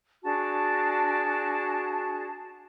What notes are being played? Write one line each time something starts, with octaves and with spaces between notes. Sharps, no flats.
D4 F#4 G#4 A5